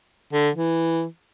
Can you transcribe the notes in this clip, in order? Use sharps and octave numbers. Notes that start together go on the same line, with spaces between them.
D3
E3